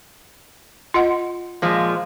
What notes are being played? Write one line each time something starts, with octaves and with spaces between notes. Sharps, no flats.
F4 D#5 F#5
A#2 F3 G#3